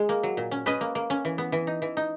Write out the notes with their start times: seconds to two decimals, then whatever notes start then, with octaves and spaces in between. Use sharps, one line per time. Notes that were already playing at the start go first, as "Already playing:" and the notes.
Already playing: G#3
0.09 A#3
0.23 F#3
0.37 A#2
0.51 C#4
0.66 C#4 B4 D#5
0.81 A#3
0.95 A#3
1.10 C#4
1.25 E3
1.38 B3
1.52 E3
1.67 D#4
1.82 E3
1.97 D#4